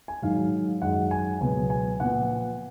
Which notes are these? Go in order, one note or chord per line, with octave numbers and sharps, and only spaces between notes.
G#5
G#2 D#3 F#3 F5
F#2 D#3 G#3 F#5
G#5
C#2 B2 F#3 B3 G#5
G#5
A#2 F3 B3 F#5